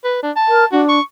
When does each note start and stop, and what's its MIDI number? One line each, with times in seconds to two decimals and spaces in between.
0.04 0.20 71
0.23 0.31 62
0.36 0.66 81
0.48 0.65 70
0.72 0.99 62
0.72 0.82 66
0.89 1.02 85